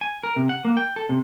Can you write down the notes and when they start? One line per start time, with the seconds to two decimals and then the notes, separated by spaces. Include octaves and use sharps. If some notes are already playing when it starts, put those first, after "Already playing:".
0.01 G#5
0.23 A#4
0.36 C3
0.49 F#5
0.65 A#3
0.77 G5
0.96 A4
1.09 C3